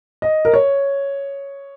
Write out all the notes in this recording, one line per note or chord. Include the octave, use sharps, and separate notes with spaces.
D#5
A#4
C#5